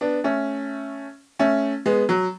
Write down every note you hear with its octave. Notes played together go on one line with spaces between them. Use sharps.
B3 D4
A3 C#4
A3 C#4
G#3 B3
F#3